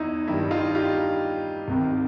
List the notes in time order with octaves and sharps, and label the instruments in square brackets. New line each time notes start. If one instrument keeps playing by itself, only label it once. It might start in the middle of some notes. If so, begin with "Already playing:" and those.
Already playing: [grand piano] E2 D#4 E4
G2 D#3 G3 E4
D#4 F4
F4 G4
C2 C3 D#3